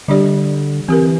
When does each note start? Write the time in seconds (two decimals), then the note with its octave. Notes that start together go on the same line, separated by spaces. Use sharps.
0.08 D3 G3 D4 G4 D5
0.88 E3 C4 G4 A#4